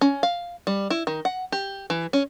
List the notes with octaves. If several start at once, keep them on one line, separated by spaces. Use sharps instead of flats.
C#4
F5
G3
E4
D#3
F#5
G4
E3
C#4